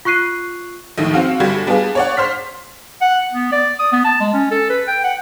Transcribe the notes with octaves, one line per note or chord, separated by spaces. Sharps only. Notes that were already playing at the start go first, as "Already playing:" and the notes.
F4 C#6 F#6 C7 D#7
A#1 D#2 A2 D#3
C4 F#4 F5
G1 G3 F#4 G#6
G3 B3 D4 F4 G#4
C#5 D5 F#5
C5 C6 F6 B6
F#5
B3
D5
D#6
B3
A5
G#3
C#4
A4
B4
G5
F#5